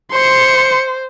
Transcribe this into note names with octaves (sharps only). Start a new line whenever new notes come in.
C5 C6 C#7